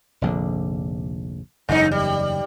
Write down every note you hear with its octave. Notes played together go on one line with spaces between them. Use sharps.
F1 A#1 D3
F#1 E2 G2 D#4
G3